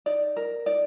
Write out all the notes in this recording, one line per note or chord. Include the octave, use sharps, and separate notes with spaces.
D#4 D5
A#4
D#4 D5